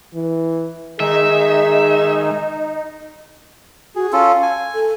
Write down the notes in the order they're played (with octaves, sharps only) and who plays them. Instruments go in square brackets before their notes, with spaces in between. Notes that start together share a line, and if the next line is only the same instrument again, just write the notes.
[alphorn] E3
[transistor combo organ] D#3 G#3 [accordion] D#4 [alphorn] G#4 [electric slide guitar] E5
[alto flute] F#4 [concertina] G#4
[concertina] C#4 F4 A4 [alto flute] F5
[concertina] G#5
[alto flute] A4